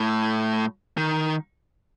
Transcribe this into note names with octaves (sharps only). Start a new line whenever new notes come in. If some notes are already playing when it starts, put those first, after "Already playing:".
Already playing: A2
D#3